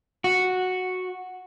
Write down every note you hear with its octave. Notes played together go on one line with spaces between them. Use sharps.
F#4